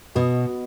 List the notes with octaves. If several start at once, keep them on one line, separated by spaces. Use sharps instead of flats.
B2 B3 F#4 B4 D#5